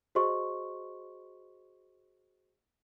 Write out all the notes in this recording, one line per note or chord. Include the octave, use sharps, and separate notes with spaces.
F#4 G#4 C5 D#5 C6 C#6